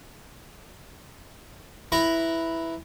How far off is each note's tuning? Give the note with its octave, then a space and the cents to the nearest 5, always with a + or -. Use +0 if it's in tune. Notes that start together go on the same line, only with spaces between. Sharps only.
E4 +0 B4 +0 A#5 +0